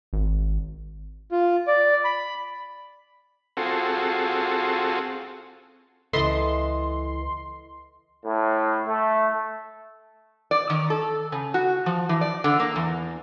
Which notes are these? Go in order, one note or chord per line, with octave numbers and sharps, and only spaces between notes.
G#1
F4
D5
B5
C4 F4 F#4 G#4 A4
C#2 E3 A4 B4 D#5 C6
A2
A3
D5
D#3
A4
C#3
F#4
F3
E3
D5
D3
A#3
E2